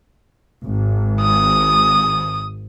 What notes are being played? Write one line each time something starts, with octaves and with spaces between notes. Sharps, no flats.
G#1
D#6